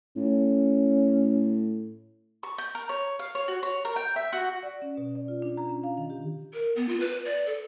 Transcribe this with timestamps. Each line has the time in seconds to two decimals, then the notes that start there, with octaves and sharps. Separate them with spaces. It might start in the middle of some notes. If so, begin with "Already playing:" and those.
0.16 A2 C#4
2.43 C#6
2.58 G6
2.75 A#4
2.89 C#5
3.19 F5
3.35 C#5
3.48 F#4
3.63 C#5
3.85 A#4
3.96 G5
4.16 E5
4.33 F#4
4.63 D5
4.82 C#4
4.98 B2
5.15 D5
5.28 F4
5.42 D4
5.57 A#5
5.69 C#4
5.84 F5
5.97 D#3
6.10 G4
6.53 A#4
6.76 B3
6.89 F4
7.00 B4
7.25 D5
7.46 A4